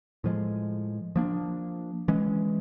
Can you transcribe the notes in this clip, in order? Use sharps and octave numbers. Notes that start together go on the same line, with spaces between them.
A2 F3 G#3
F3 A#3 D4
E3 G#3 C#4